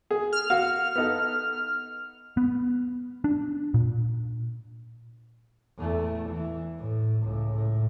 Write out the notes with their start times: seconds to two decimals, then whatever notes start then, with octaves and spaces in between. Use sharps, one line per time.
0.11 G#4
0.32 F6
0.50 F#4 F5
0.96 B3 D#4 A4
2.37 B3
3.24 D4
3.74 A#2
5.78 E2 A3
6.30 E3
6.78 A2
7.23 C#2 A2
7.53 A2